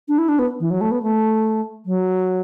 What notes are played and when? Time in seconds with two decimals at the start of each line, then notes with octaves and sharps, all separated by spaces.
0.08 D4
0.18 E4
0.28 D4
0.39 B3
0.60 E3
0.70 F#3
0.81 A3
0.91 B3
1.02 A3
1.86 F#3